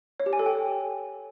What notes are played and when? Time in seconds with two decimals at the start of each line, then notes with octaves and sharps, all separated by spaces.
0.20 C#5
0.26 G4
0.33 G#5
0.39 A4
0.46 G5